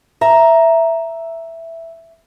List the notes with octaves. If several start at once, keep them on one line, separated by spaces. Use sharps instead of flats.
E5 A#5